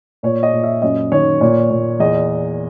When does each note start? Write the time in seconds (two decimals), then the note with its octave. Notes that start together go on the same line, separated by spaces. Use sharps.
0.23 A#2 C#5
0.43 D#5
0.53 A#2
0.63 E5
0.82 F#2 D#5
1.12 D#3 C#5
1.41 A#2 C#5
1.70 A#2
2.00 E2 D#5